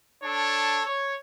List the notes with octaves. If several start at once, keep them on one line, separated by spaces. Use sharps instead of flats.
D4 A4 C#5
C#5